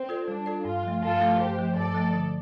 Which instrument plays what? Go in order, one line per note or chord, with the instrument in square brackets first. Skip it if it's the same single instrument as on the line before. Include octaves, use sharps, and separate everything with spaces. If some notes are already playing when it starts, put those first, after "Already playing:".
Already playing: [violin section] C4
[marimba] F4 A4 D5
[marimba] G3 [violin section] D4
[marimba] F4 A4 D5
[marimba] G2 [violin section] F4
[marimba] F3 A3
[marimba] G2 [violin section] F4 A4
[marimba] F3 A3
[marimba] G2 [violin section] G4 C5
[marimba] F3 A3
[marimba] G2 [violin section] A4 D5
[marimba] F3 A3
D3